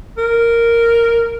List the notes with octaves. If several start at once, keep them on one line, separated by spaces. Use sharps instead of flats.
A#4